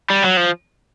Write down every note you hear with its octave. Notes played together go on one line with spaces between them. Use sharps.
G3
F#3
F3